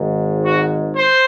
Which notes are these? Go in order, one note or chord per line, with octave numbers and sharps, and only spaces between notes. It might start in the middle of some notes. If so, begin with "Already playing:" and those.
Already playing: G#1 G#2 D#3
F#4
C5